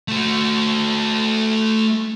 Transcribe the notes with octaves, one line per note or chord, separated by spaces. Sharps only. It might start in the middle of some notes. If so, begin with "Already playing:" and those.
A3 F#4